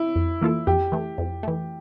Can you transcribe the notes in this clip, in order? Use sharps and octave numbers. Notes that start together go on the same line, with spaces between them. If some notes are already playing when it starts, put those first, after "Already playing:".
Already playing: E4
F2
E3 A#3 F4 A4
F2 G4
E3 A3
F2
E3 A3